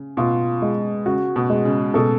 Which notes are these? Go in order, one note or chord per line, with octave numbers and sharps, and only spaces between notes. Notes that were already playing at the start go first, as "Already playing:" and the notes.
Already playing: C#3
B2 F4
G#3
C#3 F#4
B2
G#3
C#3
B2 A4